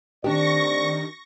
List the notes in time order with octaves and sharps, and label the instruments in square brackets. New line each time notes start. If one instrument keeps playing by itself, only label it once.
[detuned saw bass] D#3 [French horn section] A3 C4 D5 [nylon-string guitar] D4 G4 [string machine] C#6 A#6